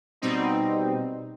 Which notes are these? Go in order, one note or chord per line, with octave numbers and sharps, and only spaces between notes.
B2 G3 C4 D#4